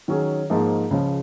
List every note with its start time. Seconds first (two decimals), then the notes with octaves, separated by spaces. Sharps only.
0.08 D#3 F#3 C#4 G#4
0.50 G#2 F3 A#3 D#4
0.91 C#2 C#3 F3